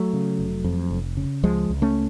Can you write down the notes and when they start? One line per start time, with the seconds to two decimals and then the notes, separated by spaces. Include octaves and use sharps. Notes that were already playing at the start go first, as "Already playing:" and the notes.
Already playing: F#3 A3
0.13 C#3
0.39 F1
0.64 F2
0.90 F1
1.17 C#3
1.43 C#2 F3 G#3
1.69 C#2
1.82 A3 C#4